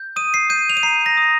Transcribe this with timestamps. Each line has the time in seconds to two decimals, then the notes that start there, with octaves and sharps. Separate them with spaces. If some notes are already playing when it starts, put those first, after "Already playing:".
Already playing: G6
0.16 D#6 D#7
0.34 C7
0.50 G6 D#7
0.69 F7
0.77 D#7
0.83 A#5 C7
1.06 A#6
1.17 D#6